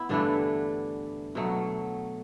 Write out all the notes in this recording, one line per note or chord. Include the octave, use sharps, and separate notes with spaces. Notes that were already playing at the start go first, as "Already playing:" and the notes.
Already playing: B3 E4
G2 D3 E3 A3 D4
B2 F#3 A3